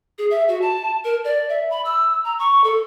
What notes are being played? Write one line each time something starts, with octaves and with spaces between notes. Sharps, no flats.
G#4
E5
F#4
A5
A#4
D5
E5
B5
E6
A#5
C#6
A4